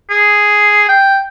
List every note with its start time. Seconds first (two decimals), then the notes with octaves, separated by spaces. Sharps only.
0.10 G#4
0.89 G5